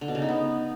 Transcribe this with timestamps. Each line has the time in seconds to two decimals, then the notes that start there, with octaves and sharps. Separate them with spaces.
0.01 D3
0.08 B2
0.15 C#3
0.22 D#4
0.29 B3